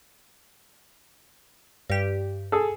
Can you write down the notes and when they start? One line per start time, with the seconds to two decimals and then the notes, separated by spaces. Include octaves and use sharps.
1.90 G2 G4
2.52 G#4 A4